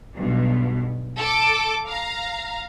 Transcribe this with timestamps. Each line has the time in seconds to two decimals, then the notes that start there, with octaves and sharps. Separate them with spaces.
0.15 B1 G2 B2
1.18 A4 D6
1.86 F5 A#5